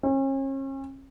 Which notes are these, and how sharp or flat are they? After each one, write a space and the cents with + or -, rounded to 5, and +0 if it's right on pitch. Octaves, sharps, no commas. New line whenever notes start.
C#4 -40